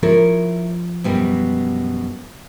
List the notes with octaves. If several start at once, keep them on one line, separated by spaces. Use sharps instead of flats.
F3 E4 A#4 C#5
F#2 B2 G3